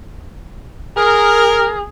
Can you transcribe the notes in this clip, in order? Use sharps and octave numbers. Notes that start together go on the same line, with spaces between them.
G#4 A#4